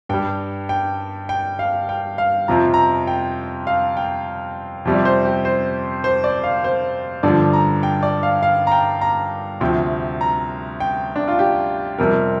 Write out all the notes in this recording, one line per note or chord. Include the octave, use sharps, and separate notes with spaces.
G2 G3 G5
G5
G5
F5
G5
F5
F2 C3 F3 A#5
A#5
G5
F5
G5
F2 C3 G3
D5
C5
G4
C5
C5
D5
F5
C5
G2 D3 F3 D5
A#5
G5
D5
F5
F5
A#5
G5
A#5
D2 C3 F3 G5
A#5
G5
D4
F4
G4
F2 C3 G3 A#4